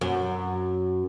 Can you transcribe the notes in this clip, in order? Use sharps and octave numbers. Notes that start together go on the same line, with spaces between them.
F#2